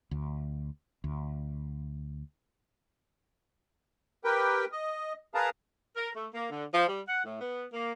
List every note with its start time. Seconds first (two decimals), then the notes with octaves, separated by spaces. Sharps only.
0.11 D2
1.04 D2
4.24 G4 A#4 B4 G5
4.72 D#5
5.34 G#4 A#4 B4 F5 A5 A#5
5.97 A#4
6.16 A3
6.33 A#3
6.51 D3
6.74 F3
6.88 G3
7.08 F#5
7.24 A2
7.41 B3
7.73 A#3